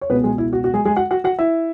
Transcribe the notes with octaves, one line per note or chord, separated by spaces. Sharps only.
C#5
C#2 B2 G#3 B3 B4
G#3 G#4
E4
F#4
F#4
G#3 G#4
G#3 G#4
F#4 F#5
F#4 F#5
F#4 F#5
E4 E5